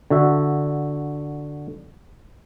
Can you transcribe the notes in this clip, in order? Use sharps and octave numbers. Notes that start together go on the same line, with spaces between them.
D3 F#4 E5